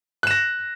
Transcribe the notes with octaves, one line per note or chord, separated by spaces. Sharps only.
F#6 A#6 E7